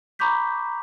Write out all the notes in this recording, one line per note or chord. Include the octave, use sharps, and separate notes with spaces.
A#5 B5 C#6 D6 G6 B6